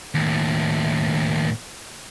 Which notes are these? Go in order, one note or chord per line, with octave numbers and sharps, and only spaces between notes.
D#2 A2